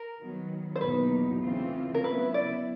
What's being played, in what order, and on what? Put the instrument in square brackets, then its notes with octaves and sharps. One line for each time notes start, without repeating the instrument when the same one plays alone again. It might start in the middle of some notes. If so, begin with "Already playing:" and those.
Already playing: [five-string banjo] A#4
[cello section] D#3 F#3 B3
[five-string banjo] C5
[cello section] E2 B2 F#3 A#3 D#4 [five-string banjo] B4
[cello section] C#3 E3 A3 C4 F4
[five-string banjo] A#4
[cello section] C#3 F#3 B3 E4 [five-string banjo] B4
[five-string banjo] D5